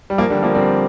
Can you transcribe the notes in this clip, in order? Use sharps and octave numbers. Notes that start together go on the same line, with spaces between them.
G3
F3 A#3
D3 G3
F3 A#3
G3 C4